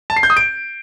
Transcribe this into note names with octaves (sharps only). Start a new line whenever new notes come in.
A5
C7
G6
D#6
D7